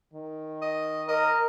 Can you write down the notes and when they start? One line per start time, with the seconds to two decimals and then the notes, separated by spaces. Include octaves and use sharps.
0.13 D#3
0.62 D#5
1.08 A#4 D#5